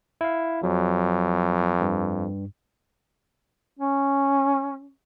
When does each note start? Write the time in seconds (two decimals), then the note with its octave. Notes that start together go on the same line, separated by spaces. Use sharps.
0.21 E4 F5
0.63 F2 F#3
1.81 G2
3.79 C#4